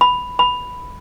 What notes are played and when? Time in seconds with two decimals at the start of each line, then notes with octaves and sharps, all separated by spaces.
0.01 B5
0.39 B5